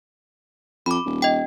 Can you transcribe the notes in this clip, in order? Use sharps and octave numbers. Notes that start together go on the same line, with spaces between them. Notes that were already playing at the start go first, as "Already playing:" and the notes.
F2 B5 D6
D#1
D#5 G5